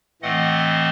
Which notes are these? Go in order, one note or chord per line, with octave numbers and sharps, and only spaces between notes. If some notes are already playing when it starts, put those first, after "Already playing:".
A2 E3 A3 C4 D#5 F#5